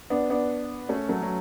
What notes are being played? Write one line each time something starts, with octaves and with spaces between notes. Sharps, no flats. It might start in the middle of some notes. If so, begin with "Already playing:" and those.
B3 D4
B3 D4
A3 C#4
F#3 A3
F#3